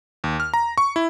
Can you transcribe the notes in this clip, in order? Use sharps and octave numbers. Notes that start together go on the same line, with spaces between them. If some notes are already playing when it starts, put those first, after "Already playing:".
D#2
F6
A#5
C#6
E4